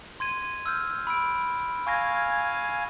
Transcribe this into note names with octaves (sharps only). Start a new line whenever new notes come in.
C6 G#6 D#7
E6 F6 G6
B5 E6 D7
F5 G#5 C#6 G#6 A#6